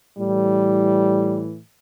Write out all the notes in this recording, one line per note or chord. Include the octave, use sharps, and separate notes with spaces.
A2 E3 G3